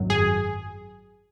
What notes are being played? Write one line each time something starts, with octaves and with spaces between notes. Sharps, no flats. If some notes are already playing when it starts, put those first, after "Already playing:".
Already playing: G#1 F#2 F#3
G#4